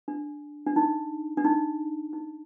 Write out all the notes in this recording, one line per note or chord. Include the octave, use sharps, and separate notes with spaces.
D4
D4
D#4
D4
D#4
D#4